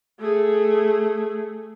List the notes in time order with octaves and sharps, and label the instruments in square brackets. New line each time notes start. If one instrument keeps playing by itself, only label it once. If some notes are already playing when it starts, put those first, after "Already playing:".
[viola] A3 G#4